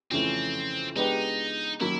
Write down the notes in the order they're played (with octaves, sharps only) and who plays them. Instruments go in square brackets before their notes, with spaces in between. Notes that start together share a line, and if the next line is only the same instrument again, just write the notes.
[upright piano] F2 C#3 E3 A3 C#4 [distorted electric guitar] C4
[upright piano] G#3 B3 D4 G4 B4 [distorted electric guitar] D#4
[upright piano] D#3 F#3 A#3 C#4 [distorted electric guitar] E4